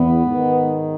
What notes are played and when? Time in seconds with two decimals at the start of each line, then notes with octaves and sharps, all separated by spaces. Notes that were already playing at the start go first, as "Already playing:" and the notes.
Already playing: E2 B3
0.25 G#2 D#3